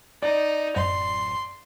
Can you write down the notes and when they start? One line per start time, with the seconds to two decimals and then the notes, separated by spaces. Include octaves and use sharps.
0.22 D#4 D5
0.76 D1 F#2 C6